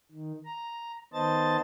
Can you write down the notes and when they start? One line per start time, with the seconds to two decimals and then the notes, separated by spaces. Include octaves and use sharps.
0.11 D#3
0.45 A#5
1.13 D#3 B3 C5 D#5 A5 A6